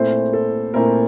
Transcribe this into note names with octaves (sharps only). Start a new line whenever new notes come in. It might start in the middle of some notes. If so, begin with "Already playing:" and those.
Already playing: A#2 A3 C4 E4 C5
A4
A#2 A3 C4 E4 A#4